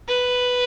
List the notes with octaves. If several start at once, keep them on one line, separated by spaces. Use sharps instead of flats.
B4